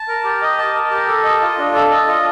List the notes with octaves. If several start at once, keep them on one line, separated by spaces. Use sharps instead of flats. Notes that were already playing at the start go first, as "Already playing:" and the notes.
Already playing: A5
A#4
G4
D#5
A5
A#4
G4
A4
D#5
F4
D4
A4
D#5
F4